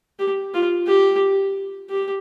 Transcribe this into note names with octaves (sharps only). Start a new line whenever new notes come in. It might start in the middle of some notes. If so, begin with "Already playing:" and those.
G4
F4
G4
G4